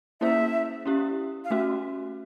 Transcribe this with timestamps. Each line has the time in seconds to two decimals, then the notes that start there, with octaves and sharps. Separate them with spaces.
0.21 A#3 C#4 E4 G#4 C5 E5
0.85 C#4 E4 G4
1.45 F5
1.50 A3 C#4 F#4 E5